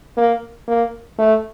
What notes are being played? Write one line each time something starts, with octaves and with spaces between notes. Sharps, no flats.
A#3
A#3
A3